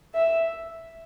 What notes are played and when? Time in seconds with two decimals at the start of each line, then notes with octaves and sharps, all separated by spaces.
0.15 E5